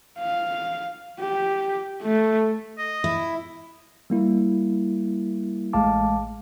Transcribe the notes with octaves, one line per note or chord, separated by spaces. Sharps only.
F5
G4
A3
D#5
E4
G3 A#3 E4
A1 G#3 A3 F5 A5 D6